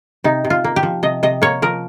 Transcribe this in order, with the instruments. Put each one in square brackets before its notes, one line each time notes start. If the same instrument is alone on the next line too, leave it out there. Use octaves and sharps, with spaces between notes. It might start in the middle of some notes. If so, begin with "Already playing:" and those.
[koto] C3 D#4
C3
F4
A#3
G4
F3
C3 D#5
C3 D#5
A#3 C#5
F3 A#4